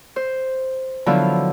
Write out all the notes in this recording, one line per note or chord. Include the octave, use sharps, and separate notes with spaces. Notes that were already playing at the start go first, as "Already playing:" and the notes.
C5
D3 F3 F#3 B3 E4 F4